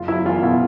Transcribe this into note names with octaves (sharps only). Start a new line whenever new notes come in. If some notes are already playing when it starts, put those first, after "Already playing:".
Already playing: F#1 F4
F#3 E4
E2 F4
B2 E4